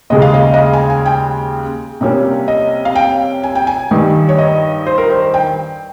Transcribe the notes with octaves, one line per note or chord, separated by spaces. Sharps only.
D#2 C#3 G#3 D#5
F5
D#5
D#5
F5
G#5
G#5
G5
C3 G3 A#3 C#4
D#5
F5
G5
G#5
G5
G#5
G2 D#3 G3
C#5
D#5
C5
A#4
C5
G5